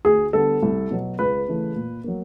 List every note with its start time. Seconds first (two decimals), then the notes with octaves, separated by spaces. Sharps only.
0.05 D2 G#4
0.33 D3 G3 B3 A4
0.62 C2
0.91 B2 F#3
1.19 C#2 B4
1.48 C#3 E3 A3
1.75 A#2
2.04 F#3 A#3